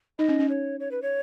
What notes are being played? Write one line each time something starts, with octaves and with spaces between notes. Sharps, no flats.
D#4 D#5
C#4
C#4
C#5
C#5
B4
C#5